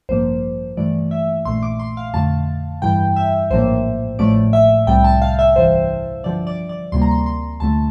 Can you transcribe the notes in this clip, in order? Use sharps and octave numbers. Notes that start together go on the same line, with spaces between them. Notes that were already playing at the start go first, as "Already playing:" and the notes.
A1 G2 F3 A#3 C5
G2 E3 A3 D5
E5
A#1 A#2 A3 C6
D6
C6
F5
F2 D3 A3 A5
G2 E3 G3 G5
E5
A#1 A2 F3 A#3 C5
A1 A2 F3 A3 D5
E5
C2 C3 G3 G5
A5
F5
E5
A1 G2 E3 C5
G2 D3 F3 D5
D5
D5
D2 C3 G3 A#3 C6
A#5
C6
C6
D2 D3 A3 A5